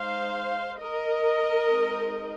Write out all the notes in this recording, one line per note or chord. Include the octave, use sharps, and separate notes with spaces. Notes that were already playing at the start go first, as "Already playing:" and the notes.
Already playing: G#3 D#4 C5 F5
A#4 D#5
G#3 C4 D#4